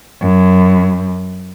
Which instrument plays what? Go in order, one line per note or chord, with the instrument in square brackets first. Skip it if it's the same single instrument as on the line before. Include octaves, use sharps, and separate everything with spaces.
[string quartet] F#2